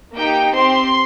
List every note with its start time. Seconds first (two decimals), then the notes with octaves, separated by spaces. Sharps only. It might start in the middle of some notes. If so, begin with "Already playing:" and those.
0.15 A#3 D#4 G4 G5
0.52 C4 G4 C6